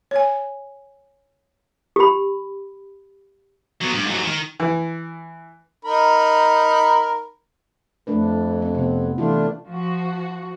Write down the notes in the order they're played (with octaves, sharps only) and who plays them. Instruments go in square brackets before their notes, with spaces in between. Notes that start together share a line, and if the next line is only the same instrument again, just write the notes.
[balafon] C#5 G#5
[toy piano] G4 B5
[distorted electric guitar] F#3 B3
G2
G#2 F#3
D#3
[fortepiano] E3
[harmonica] D#4 A#4 B5
[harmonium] F2 [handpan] A3 D4 B4
[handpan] C4
C3 B3
[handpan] E3 E4 F4 [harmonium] A3 D4
[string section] F3 F#4